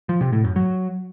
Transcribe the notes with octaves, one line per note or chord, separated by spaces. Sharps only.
F3
C3
A2
F#2
F#3